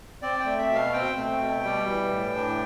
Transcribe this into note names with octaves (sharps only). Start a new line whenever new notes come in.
C4 D5
G5
A3
E5
B2
F5
C4 G5
A3
B2
G3
E3
A2
D4